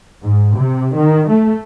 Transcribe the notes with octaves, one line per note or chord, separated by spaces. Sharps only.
G#2
C3
D#3
A3